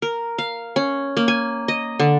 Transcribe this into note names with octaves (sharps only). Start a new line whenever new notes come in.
A#4
F5
C#4
A#3
G#5
D#5
D3